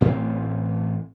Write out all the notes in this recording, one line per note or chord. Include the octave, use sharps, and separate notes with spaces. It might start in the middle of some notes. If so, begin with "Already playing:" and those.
A1 A2 E3 C4